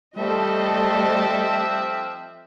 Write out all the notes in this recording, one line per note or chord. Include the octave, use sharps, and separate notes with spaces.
F3 G3 A3 C4 A4 C5 D#5 E5